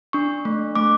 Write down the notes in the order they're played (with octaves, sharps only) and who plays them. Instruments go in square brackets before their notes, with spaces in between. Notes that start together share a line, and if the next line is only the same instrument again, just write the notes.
[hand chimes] D4 C#6
A3
A3 D6